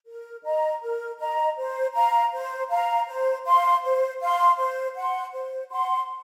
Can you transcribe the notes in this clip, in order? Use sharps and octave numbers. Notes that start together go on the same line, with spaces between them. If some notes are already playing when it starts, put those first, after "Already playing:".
A#4
D#5 A#5
A#4
D#5 A#5
C5
F5 A#5
C5
F5 A#5
C5
F5 C6
C5
F5 C6
C5
F#5 C6
C5
F#5 C6